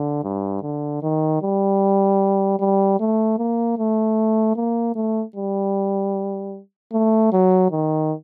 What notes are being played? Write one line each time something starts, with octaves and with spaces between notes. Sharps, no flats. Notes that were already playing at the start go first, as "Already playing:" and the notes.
Already playing: D3
G2
D3
D#3
G3
G3
A3
A#3
A3
A#3
A3
G3
A3
F#3
D#3